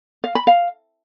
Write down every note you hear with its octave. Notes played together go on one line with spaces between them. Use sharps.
F5
B5
F5